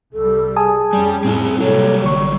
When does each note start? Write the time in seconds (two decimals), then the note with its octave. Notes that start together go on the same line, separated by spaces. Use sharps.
0.13 C2 G3 A4
0.56 G#4 G#5 A5 D#6
0.93 F2 G3 C#4
1.24 F2 A2 G3 C4 E4
1.60 C3 F#3 G3 A#3 A4 C#5
2.04 A1 D3 C#6